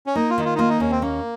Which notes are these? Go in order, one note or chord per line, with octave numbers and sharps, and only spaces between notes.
C#4
A#3 D#4
F4
D#3 D#4
F4
D#4
A#3 F4
D#4
D#2 C#4
C4
A#3 C#4